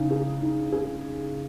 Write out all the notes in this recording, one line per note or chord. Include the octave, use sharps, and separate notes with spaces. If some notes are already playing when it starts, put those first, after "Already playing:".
Already playing: C#3 D#4
G#4
D#4
G#4